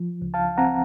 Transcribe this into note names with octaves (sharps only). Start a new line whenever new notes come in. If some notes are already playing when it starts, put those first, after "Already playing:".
Already playing: F3
C#2
F5 A5
C4 F#5 A#5